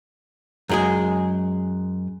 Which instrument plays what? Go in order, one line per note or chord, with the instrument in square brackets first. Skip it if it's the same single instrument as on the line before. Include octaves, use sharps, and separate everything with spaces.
[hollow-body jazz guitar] F#2 G#3 G#4